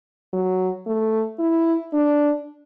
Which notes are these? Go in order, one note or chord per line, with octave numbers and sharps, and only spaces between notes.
F#3
A3
E4
D4